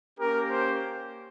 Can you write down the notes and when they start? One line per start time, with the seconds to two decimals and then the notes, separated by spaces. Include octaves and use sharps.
0.19 A#3 C#4 G4 A#4
0.49 C5